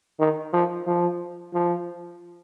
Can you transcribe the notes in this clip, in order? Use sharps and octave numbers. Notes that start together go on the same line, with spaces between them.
D#3
F3
F3
F3